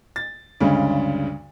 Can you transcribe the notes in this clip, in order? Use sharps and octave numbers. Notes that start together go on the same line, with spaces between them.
A6
D2 G2 C#3 G#3